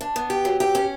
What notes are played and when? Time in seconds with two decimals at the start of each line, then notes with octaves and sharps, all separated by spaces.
0.01 D4
0.16 B3
0.30 G4
0.45 F#3
0.60 G4
0.75 C#4